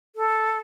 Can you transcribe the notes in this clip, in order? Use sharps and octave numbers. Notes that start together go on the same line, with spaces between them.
A4